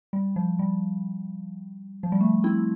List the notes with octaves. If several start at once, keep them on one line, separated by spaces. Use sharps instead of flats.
G3
F3
G3
F3
G3
A3
C4 E4